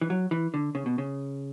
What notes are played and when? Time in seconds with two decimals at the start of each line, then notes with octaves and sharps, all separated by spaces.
0.01 E3
0.10 F#3
0.31 E3
0.54 D3
0.75 C#3
0.86 B2
0.98 C#3